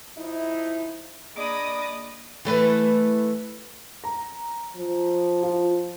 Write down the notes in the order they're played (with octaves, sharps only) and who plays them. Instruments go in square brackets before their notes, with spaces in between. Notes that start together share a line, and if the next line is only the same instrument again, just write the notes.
[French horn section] F3 D#4 E4
[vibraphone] A#3 [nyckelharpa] D4 B5 [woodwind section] G#4 D5 D#5 [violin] D6 D#6
[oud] E3 A3 B4
[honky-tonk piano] A#5
[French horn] F3
[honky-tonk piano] F4